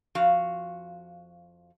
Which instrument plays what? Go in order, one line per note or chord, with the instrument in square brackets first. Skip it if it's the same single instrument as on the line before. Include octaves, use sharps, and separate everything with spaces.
[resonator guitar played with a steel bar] F2 F3 F#4 F5